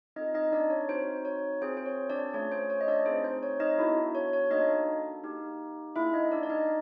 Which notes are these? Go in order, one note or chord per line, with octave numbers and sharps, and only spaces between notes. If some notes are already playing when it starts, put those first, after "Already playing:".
C4 D#4 F4 A4 D#5
D#4 D#5
D4 D5
C#5
C4 D#4 F#4 C5
C#5
C4 F4 G#4 C5
C5
C#5
D4 D5
A3 C#4 F4 G#4 C#5
C5
C#5
D#5
D4 D5
A3 C4 D#4 G#4 C5
C5
C#5
D#4 D#5
B3 D4 E4 F#4 A4 E5
C#5
C#5
A#3 D4 D#4 F#4 A4 D#5
A#3 D#4 G4
A#3 D4 E4 F4 G#4 E5
D#4 D#5
D4 D5
D5
D#4 D#5